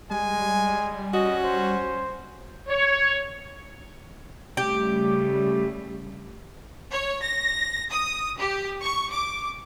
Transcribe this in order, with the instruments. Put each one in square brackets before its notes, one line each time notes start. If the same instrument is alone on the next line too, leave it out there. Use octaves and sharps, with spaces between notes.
[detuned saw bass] G3 [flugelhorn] G#3 [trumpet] G#5
[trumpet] C#4 [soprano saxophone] F#4 [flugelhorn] D#5
[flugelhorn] C5
[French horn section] C#5
[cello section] C#3 G3 A3 [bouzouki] G4
[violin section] C#5
A#6
D#6
G4
C#6
D6